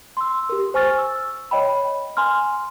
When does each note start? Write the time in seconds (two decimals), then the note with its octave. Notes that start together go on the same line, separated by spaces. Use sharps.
0.17 C6 E6
0.49 G4 A#4
0.74 C5 G#5 C#6 F6 A6
0.98 E6
1.51 C#5 D#5 G5 B5
2.17 G#5 A#5 C6 F6